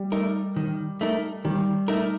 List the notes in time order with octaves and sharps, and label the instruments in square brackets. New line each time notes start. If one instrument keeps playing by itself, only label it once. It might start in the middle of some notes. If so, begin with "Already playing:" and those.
Already playing: [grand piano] G3
[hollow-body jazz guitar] A3 D#4 A#4
D#3
A3 D#4 A#4
[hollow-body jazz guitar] D#3 [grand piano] G3
[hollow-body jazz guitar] A3 D#4 A#4